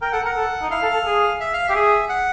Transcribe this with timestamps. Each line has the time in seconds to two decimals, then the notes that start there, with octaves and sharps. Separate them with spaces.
0.02 A#4 G5
0.12 A4 F#5
0.25 A#4 F#5
0.36 A4
0.62 D#4
0.70 E4 F5
0.82 A4
0.93 A4
1.06 G#4
1.40 E5
1.53 F5
1.67 G4 E5
1.75 G#4
2.09 F#5